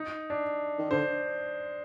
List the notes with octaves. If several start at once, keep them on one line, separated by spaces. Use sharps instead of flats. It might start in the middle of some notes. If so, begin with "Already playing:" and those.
Already playing: D#4
D4
D#3
D3 C5